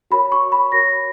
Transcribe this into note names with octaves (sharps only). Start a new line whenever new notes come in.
F#4 A#4 C#5 B5
C#6
B5
F#4 A#4 C#5 A#6